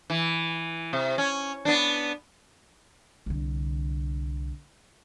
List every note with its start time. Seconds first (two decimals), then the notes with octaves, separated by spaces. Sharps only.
0.10 E3
0.93 C3
1.18 C#4
1.65 B3 D4
3.26 C2 D3